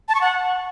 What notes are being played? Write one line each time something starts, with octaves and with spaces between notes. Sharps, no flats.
A5
C#6
F#5